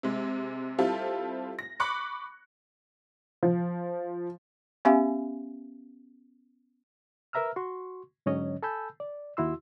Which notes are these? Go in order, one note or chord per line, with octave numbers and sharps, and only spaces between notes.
C3 G#3
G3 C4 E4 F4 G4 A4
A#6
B5 C#6 D6 F#6 C#7
F3
B3 C#4 G4 E5 F5 G#5
A#4 B4 E5 A#5 E6 F6
F#4 C6 C#6
G#2 D3 F#3 C#4 C#5 D#5
A4 G#5 A5 B5 E6 G6
D5
D#2 E4 F#4 C6 E6